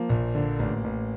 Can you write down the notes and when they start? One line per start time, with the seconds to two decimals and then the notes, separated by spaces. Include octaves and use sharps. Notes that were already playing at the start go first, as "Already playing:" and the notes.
Already playing: F3 A#3
0.09 A#1
0.35 D3
0.59 A1
0.84 A1